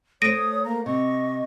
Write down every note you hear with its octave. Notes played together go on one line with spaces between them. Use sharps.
A3 C5 C#5 D#6 A#6 D7 D#7
A#3 A#5
C3 D#5 C#6